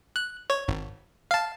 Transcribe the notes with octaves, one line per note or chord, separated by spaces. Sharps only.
F#6
C#5
G#1
F5 A5